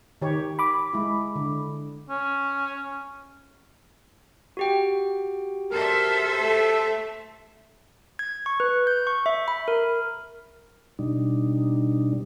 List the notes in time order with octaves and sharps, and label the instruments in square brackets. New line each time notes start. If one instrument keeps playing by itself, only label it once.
[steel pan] D#3 G4 C#5
[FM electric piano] B5 D6
[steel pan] G#3 E4
D3
[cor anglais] C#4
[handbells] F#4 G4 G5
[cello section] A4 C5 E5 [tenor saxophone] A#4
[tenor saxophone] A3
[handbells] G#6
C#6
B4
G6
C#6
E5
B5
A#4
[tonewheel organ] B2 G3 D4 D#4